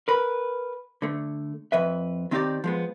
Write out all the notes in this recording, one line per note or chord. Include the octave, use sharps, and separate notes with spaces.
A#4 B4
D3 A3
F2 B4 E5
D#3 C4 D#4 F4 G4 D5
F3 G#3 B3